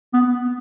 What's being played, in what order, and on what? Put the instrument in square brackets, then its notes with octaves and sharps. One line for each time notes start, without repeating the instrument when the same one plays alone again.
[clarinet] B3